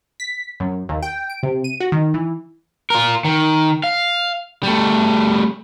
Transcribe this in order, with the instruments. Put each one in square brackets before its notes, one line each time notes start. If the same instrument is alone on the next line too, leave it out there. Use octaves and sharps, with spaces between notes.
[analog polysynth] B6
F#2
D#2
G5
D7
C3
D#7
F#4
D#3
E3
[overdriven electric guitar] F4 A#4
D#3
F5
G3 A3